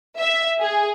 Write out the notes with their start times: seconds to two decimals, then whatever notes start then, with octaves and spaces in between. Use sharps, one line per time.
0.20 E5
0.61 G#4